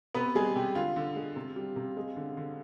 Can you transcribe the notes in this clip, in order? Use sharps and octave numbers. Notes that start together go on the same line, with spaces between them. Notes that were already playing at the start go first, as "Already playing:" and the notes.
C3 B3 B4
G3 G#3 G#4
C3 G4
D3 F4
D3
G#3
C3
G3
C3
G#3
D3
D3